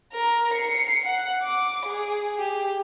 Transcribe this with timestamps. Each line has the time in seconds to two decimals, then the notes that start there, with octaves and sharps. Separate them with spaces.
0.12 A#4
0.53 C7 C#7
1.04 F#5
1.43 D6
1.86 G#4
2.39 G4